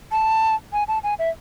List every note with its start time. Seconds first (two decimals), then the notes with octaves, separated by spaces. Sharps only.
0.12 A5
0.73 G#5
0.88 A5
1.04 G#5
1.19 E5